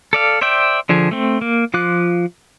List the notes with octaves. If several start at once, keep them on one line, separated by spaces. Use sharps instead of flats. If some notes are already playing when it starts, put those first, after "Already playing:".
A4 D5 F5
C5 D5 E5 G5
D3 F3 G#4
A3 C4
A#3
F3 F4 D6 F#6